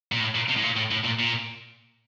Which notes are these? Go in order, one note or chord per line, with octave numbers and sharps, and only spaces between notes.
A#2
A2
A#2
C3
A2
A#2
A2
A2
A#2
A#2